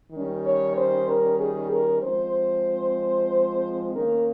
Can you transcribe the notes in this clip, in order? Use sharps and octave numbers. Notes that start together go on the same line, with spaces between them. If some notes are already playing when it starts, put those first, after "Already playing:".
D#3 G3 C#4
C#5
C5
A#4
G#4
A#4
F3 G#3 C4 C5
D#3 A#3 C#4 A#4